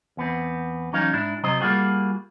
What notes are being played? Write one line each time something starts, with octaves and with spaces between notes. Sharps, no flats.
E2 B3 C4
E3 F#3 C#4 D#4 F5
G#2 D4 E4
C3 F#3 C5 D#5
G3 A#3 F4 F#4 G#4